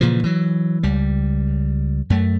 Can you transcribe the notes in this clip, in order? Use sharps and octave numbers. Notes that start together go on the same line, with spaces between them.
A#2 C#3 E3 F3
E3 F#3
C#2 G3
F#2 A3